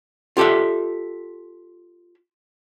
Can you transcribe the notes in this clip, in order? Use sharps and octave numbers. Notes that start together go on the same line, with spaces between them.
F4 G4 A4 D5 E5